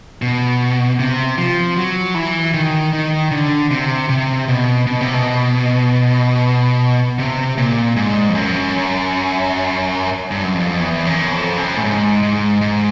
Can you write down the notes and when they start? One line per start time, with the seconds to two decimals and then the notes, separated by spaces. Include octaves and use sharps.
0.22 B2
0.99 C3
1.38 F3
1.77 F#3
2.15 E3
2.54 D#3
2.93 D#3
3.31 D3
3.70 C3
4.09 C3
4.48 B2
4.87 B2
5.01 C3
5.14 B2
7.19 C3
7.58 A#2
7.96 G#2
8.29 F2
8.35 F#2
10.31 G2
10.43 F#2
10.55 F2
10.80 E2
11.06 F#2
11.32 F2
11.57 F#2
11.77 A2
11.84 G#2
12.23 G#2
12.61 G#2